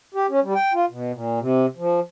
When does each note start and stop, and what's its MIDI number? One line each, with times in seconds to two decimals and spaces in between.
0.14 0.26 67
0.29 0.40 61
0.43 0.54 55
0.55 0.73 79
0.74 0.85 65
0.90 1.12 47
1.12 1.39 46
1.40 1.66 48
1.77 2.00 53